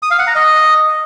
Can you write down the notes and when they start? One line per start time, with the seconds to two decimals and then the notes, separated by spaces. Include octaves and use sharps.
0.03 D#6
0.11 F5
0.19 F#5
0.27 A#5
0.35 D#5